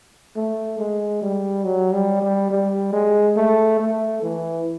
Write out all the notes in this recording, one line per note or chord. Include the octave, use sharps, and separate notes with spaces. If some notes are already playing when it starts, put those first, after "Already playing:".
A3
G#3
G3
F#3
G3
G3
G3
G#3
A3
A3
E3